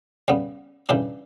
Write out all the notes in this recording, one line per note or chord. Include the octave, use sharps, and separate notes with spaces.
C#3 G3 B3
C#3 E3 G3 D4 G4